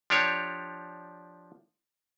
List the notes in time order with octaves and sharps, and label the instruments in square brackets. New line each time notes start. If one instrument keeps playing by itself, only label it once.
[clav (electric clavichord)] F3 D4 G4 C#5